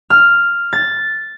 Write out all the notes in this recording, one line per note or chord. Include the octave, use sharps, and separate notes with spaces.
F6
A6